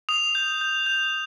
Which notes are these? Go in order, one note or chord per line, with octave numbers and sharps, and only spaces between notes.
D#6 F7
G6
G6
G6